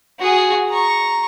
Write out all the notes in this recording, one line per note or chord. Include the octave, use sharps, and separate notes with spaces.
F#4 G#4
A#5 C#6